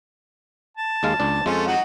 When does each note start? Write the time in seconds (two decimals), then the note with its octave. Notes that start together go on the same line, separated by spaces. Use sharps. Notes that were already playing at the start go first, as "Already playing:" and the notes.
0.77 A5
1.03 D#2 G#3 F5
1.20 C#2 D4
1.46 F2 G#3 A3 C#4 F4
1.67 F#3 D#4 F#4